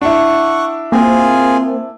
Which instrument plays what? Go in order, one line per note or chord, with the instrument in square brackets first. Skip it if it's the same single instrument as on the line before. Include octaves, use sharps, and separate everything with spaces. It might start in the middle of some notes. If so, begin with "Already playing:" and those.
[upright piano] D4 E4 [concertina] F#5 C#6
[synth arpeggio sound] A#3 C4 [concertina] F4 G#4 G#5